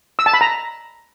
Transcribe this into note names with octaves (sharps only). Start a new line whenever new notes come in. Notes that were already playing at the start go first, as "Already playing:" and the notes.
E6
A5
B5
A#5